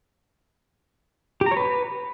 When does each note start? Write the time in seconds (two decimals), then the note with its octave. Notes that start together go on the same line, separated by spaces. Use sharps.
1.41 G4
1.46 A#5
1.51 C#5
1.57 B4